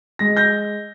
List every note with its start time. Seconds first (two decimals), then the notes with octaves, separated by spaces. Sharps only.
0.19 G#3 A#6
0.37 G6 A#6